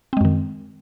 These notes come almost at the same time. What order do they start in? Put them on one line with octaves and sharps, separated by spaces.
C4 G#3 F#2 D#3